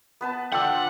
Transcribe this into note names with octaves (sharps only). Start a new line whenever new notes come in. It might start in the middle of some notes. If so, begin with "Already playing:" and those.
B3 B4 A5
D4 F4 A4 F#5 G5 E6